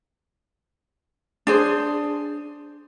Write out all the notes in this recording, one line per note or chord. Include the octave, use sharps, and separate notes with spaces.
D4 G#4 C5